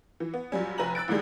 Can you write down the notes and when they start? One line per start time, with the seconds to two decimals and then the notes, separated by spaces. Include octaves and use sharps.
0.20 E3
0.34 B3
0.52 F#2 A#2 G3 C#4
0.78 F1 B4 G#5 A#5 F#7
0.95 E6 F#6 A6 D7
1.08 C2 A2 D#3 G3 G#3